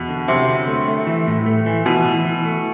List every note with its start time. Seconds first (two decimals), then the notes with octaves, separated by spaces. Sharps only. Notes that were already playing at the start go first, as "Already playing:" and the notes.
Already playing: E2 B2
0.09 D3
0.28 C3 F#3
0.48 D3
0.67 A3
0.87 A3
1.07 E3
1.27 A2
1.46 A3
1.66 E3
1.86 B2 E3
2.05 E3
2.25 E3
2.45 A3